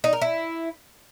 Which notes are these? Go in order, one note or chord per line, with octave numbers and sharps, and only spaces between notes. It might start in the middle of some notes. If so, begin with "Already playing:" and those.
D#4
A#4
E4